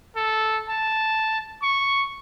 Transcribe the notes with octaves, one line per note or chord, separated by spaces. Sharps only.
A4
A5
C#6